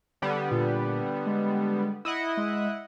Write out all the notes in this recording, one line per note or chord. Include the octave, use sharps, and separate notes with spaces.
D3 G3 B3
A#2
G#3
E4 D#5 F#5 D#6
G#3